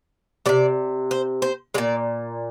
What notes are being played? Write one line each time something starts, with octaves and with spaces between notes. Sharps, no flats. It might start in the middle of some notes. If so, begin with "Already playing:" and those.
C3 G3 D5
C5
C5
A#2 G#3 D5